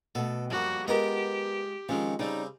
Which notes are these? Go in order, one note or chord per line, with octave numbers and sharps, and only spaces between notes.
B2 A3 A4
F#2 F3 G3 A#3 F#4
G#3 B3 F4 G4 A#4 D#5
D#3 F3 G#3 C4 C#4
C#3 G3 C4 D#4 C#5 D5